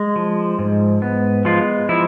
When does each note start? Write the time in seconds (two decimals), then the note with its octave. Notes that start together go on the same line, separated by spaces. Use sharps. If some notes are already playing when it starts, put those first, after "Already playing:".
Already playing: G#3
0.16 F3
0.59 G#2
1.02 B3
1.45 F3 G#3 F4
1.89 F3 E4